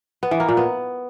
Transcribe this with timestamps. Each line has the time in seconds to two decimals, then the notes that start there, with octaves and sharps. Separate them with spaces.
0.23 B3
0.31 E3
0.40 A#3
0.49 A#2
0.57 B3